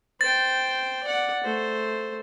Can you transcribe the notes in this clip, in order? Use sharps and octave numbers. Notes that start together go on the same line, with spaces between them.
C5 G5 A6
D5 F#5
A3 C5